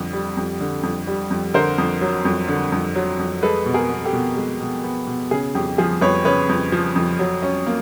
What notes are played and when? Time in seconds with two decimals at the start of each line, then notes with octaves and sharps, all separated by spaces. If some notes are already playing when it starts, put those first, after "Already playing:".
Already playing: F2 D3
0.13 G3
0.37 F2
0.61 D3
0.83 F2
1.07 G3
1.30 F2
1.54 D3 A#4 C5
1.78 F2
2.01 F#3
2.25 F2
2.48 D3
2.72 F2
2.95 F#3
3.19 F2
3.43 G#3 A4 B4
3.66 B2
3.74 G#4 A#4
3.90 B3
4.05 G4 A4
4.13 B2
4.37 G#3
4.61 B2
4.84 B3
5.07 B2
5.31 C#3 G#4
5.55 F2 G4
5.78 F3 G#4
6.01 F2 B4 C#5
6.25 C#3 B4 C#5
6.49 F2
6.72 F3
6.96 F2
7.19 F#3
7.43 C#4
7.66 A#3